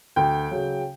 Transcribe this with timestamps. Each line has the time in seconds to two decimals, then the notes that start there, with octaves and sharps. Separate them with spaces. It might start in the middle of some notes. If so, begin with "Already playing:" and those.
0.16 D2 G5
0.51 C#3 F#3